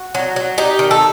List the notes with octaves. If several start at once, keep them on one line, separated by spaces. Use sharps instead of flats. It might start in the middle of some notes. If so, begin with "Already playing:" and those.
Already playing: F#4
F#3
F#3
D#4 G4
D#3
A4